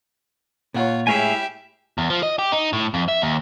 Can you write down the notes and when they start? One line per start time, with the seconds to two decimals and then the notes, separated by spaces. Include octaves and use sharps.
0.74 A#2 F4 C#5 F#5
1.07 A2 G#3 E4 G4 C#5 E5 F5 G#5
1.98 E2
2.10 F3
2.23 D#5
2.39 G4
2.52 D#4
2.73 A2
2.94 F2
3.08 E5
3.22 D#2